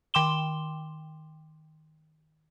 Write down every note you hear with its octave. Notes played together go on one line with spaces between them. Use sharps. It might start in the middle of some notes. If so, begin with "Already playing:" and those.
D#3 G5 C6 D6 E7 G7